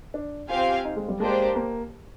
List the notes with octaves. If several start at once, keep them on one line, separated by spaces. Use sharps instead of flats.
D4
C4 F4 G4 C5 F5 G#5
D#4
G#3
G3
G#3 A#3 D4 G4 C5
A#3